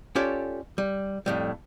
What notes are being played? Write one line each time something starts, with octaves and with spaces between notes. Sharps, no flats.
C#4 F4 G4 A4 C#5 D5
G3
F2 A2 G3